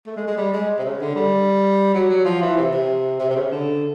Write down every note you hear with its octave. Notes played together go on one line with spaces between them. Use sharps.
A3
G#3
G#3
G3
G#3
C3
C#3
D3
G3
F#3
F#3
F3
E3
C3
C3
C3
C3
C#3
D3